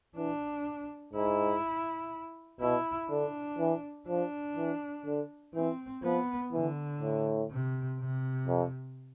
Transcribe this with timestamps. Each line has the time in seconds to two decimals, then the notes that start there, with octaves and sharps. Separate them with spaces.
0.16 E3 D4
1.14 G#2 E4
2.61 B2 E4
3.10 D3 D4
3.59 E3
4.08 F3 D4
4.57 E3
5.06 D3
5.55 E3 C4
6.03 F3 B3
6.53 D3 E3
7.01 A2
7.51 C3
8.00 C3
8.48 F2